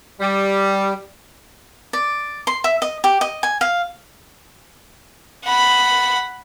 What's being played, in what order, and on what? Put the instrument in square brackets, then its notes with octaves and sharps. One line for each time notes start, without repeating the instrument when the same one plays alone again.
[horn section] G3
[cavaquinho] D5
C6
E5
D#5
G4
D#5
G#5
F5
[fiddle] F#5 B5